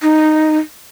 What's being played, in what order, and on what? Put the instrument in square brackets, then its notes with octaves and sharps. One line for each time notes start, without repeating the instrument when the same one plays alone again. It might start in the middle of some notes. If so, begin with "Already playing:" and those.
[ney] D#4